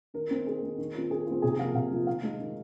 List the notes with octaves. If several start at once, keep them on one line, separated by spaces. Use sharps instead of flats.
D#3 A#4
C4 D#4
D#3 G#4
C4 D#4
D#3
C4 F4
D#3 G#4
C4 F4
C3 G#4
F3 A#3 F5
C3 F5
F3 A#3
D#3 F5
G#3 D#4
D#3